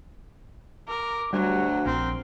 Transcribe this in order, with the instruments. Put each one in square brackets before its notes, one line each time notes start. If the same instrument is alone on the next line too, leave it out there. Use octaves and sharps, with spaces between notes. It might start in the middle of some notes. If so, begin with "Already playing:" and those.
[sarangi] A#4 [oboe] D6
[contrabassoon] D2 [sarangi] F#3 [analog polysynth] G3 [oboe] F#5
[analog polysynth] A#1 [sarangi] C4 [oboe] A#4